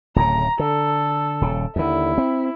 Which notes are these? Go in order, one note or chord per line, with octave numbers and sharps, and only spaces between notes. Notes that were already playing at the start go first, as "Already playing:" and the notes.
D1 A2 C#3 A#5
D3 A4
D#1 C#3
D#2 D3 E4
C4